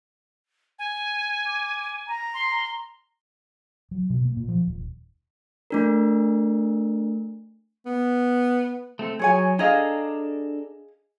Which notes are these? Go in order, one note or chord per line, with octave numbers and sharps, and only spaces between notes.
G#5
D6
A#5
C6
F#3
B2
A#3
A#2
F3
D#1
A3 D4 A#4
B3
A3 C4 A4
F#3 G#4 C#5 G#5
D4 G#4 A4 D#5 F5 A#5